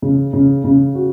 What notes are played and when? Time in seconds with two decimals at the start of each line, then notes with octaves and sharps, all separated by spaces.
0.02 C#3
0.33 C#3
0.64 C#3
0.95 F#4